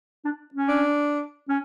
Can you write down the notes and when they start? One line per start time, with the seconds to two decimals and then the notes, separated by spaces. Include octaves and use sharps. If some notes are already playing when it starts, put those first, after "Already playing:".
0.25 D4
0.54 C#4
0.69 D4
1.49 C#4